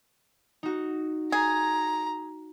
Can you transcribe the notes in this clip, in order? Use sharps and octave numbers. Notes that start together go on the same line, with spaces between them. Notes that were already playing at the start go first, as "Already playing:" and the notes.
D#4 F#4
G#4 A#5